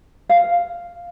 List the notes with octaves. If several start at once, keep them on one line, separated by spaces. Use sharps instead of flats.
F5